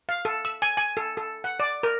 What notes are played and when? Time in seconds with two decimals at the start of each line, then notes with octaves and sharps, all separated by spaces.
0.09 F5
0.25 A4
0.45 E6
0.62 G#5
0.77 G#5
0.97 A4
1.17 A4
1.44 F#5
1.60 D5
1.83 A#4